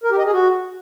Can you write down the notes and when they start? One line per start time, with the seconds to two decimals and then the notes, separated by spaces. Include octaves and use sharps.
0.04 A#4
0.11 G4
0.18 D#5
0.26 G#4
0.33 F#4